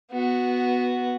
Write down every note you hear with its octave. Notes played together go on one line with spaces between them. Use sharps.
B3 F#4